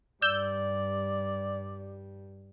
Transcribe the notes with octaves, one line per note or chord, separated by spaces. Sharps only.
G2 G3 D5 E6 G6